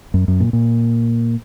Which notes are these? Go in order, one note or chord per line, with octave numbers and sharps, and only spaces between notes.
F#2
F#2
A#2
A#2